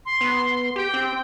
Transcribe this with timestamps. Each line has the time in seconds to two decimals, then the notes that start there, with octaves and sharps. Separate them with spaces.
0.06 C6
0.21 B3
0.76 G4 G5
0.94 C4